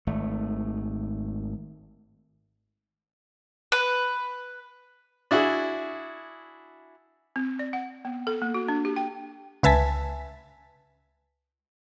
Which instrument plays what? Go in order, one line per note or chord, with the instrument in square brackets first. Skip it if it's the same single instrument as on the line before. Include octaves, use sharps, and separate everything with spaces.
[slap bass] G#1 A3
[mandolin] B4
[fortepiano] D4 E4 F#4 G#4
[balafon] C4
D5
F#5
B3
A4
A#3
F#4
D4
G4
G5
[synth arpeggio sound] C#2 B4 E5 G#5 A5 B6